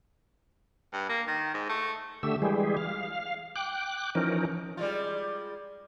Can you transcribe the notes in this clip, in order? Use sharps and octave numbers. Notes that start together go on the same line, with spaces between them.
G2
A#3
D#3
G#2
A3
D3 A3 G4 E6
E3 G3 G#3 G4 G#4
F5
G5 D6 F#6
E3 F3 C#4 D#4 A#4
G3 G#3 F4